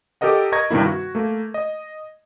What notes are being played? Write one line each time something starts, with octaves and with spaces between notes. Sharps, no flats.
G4 A4 A#4 D#5 F#5
A#4 D#5 A#5 C#6 G#6 A#6
G2 C3 D#3 A#3 E4
F#4
A3 A#3
D#5